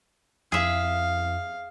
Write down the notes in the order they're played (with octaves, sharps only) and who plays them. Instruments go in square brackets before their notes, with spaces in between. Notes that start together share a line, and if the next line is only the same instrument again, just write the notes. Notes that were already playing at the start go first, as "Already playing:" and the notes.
[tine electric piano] F2 E4 [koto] G#4 E5 [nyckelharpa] F5